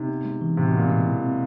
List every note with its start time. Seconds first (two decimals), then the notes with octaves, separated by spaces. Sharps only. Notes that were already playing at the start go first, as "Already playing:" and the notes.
Already playing: C3 D#4
0.09 B3
0.25 G#3
0.41 E3
0.57 A2 C3
0.67 B2
0.74 A#2 B3
0.86 B2 G#3
1.06 E4
1.23 C4